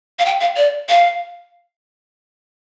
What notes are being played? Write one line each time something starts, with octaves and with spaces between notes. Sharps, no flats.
F5
G5
F5
D5
F5